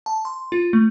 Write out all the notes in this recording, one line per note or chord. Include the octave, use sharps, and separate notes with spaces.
A5
C6
F4
A3